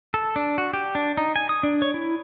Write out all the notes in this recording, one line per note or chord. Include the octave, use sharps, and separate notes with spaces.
A4
D4
F#4
G4
D4
D#4
G#5
D#6
D4
C#5
E4